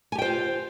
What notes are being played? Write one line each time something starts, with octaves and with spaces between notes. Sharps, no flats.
F4 G4 C5 G5 G#5